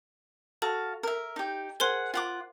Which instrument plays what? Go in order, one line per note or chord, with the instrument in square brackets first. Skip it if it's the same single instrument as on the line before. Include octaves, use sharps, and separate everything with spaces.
[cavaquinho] F#4 F5 A5 [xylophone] A4
[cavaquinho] A#4 E5
D#4 G4
[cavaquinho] G#4 F#5 [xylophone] A#4 C5 C6
[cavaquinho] F4 F#5 D6